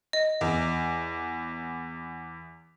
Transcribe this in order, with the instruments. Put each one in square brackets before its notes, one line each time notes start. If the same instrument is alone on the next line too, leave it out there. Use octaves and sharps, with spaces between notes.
[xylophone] D#5
[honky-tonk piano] E2